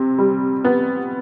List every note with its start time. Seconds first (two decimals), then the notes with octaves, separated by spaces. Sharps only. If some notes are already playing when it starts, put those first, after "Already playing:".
Already playing: C3
0.18 G3
0.64 B3